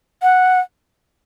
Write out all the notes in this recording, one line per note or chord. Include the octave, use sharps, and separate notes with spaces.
F#5